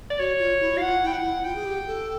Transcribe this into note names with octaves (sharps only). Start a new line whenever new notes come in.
D5
F#4 C#5
F4
E4
F#4 F5
F4 F#5
E4 G5
F#5
E4
F4 G5
G#4
G4
A4